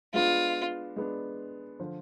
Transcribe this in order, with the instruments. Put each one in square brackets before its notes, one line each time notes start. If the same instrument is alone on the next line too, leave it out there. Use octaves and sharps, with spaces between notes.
[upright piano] G#3 B3 D4 [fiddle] F4
[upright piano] G#3 B3 D4
D3 F3